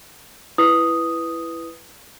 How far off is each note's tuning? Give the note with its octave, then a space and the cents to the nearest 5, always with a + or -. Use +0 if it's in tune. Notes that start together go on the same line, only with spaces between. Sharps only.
E4 +15 B4 +0 D#6 +0